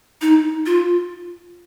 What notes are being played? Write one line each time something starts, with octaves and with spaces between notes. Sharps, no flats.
D#4
F4